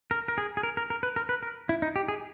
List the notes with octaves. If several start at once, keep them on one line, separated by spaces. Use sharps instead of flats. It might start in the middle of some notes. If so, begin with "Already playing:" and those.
A#4
A#4
G#4
G#4
A#4
A#4
A#4
B4
A#4
B4
A#4
E4
D#4
G4
G#4